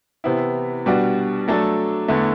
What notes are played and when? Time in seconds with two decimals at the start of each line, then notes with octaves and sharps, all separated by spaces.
0.24 C3 E3 B3 E4
0.86 B2 G3 D4 F#4
1.48 F#3 A3 D4 A4
2.08 E2 D3 A3